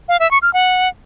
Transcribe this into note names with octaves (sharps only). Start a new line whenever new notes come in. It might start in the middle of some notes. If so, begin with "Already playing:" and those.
F5
E5
C#6
F6
F#5